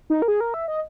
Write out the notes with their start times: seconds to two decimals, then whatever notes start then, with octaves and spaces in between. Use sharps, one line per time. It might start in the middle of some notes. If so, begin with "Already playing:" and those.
0.10 D#4
0.22 A#4
0.28 G#4
0.41 A#4
0.54 E5
0.68 D#5